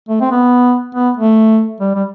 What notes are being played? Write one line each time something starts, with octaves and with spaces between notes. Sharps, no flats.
A3
C4
B3
B3
A3
G3
G3